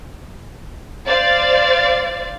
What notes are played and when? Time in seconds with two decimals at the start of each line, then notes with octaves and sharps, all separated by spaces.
1.06 C5 D5 F5 A6